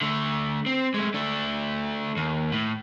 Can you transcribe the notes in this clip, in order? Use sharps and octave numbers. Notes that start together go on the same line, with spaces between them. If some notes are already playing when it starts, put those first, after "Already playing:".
D3 A3
C4
G#3 A3
A3 D4
D#2
A2